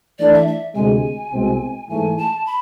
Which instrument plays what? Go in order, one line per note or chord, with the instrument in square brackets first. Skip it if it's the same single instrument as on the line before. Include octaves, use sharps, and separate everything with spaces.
[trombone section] E3 A3 D4 [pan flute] D5
[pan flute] E5
E5
[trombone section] D2 C3 G#3 [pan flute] G#5
[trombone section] C2 B2 G#3 C4
[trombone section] G#2 E3 A3 [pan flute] G#5
[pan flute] A5
B5